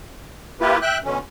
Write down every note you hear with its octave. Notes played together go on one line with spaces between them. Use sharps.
A#3 E4 F4 G4 B4
E5 G5 F#6
B2 D3 C#4